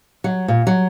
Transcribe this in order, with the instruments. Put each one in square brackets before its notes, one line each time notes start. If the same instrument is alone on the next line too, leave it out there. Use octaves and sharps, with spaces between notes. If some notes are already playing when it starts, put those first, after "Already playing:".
[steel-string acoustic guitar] F#3
A#2
F#3